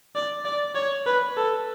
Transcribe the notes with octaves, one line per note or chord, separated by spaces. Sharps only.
D5
D5
C#5
B4
A4